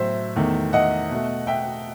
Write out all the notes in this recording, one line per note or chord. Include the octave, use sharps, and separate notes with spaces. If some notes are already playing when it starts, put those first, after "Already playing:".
Already playing: A2 F#3 A3 C5 E5
E2 D#3 A3
D#5 F#5
B2 A3
E5 G5